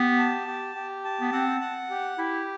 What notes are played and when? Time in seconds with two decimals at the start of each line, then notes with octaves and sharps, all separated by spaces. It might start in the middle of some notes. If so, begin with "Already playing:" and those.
Already playing: B3 G4
0.19 A5
0.47 G4
0.75 G4
1.05 A5
1.21 B3
1.32 C4 F#5
1.61 F#5
1.90 G4
2.18 E4 G4